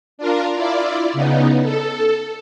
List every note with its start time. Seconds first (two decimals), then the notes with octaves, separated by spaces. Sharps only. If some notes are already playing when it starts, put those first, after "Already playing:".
0.18 D4 F4 A#4
0.55 E4 F4 D5
1.13 C#3 B3 D#4
1.63 A4